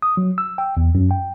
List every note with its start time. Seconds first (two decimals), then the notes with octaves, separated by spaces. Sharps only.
0.02 D#6
0.17 F#3
0.38 E6
0.58 G5
0.77 E2
0.95 F#2
1.11 G5